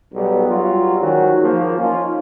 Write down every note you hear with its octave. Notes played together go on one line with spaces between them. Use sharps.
B1 G3 B3
F#3 G3 F4
G#2 D#3 F#3 C#4 F#4
F3 A#3
C#4 D#4 F4